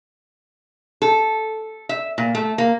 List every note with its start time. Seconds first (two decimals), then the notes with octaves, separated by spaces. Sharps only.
1.02 A4
1.89 E5
2.18 A#2
2.35 A3
2.58 A#3